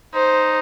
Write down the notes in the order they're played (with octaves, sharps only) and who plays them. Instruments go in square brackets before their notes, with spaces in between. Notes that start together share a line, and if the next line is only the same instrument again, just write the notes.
[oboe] D#4 [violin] C5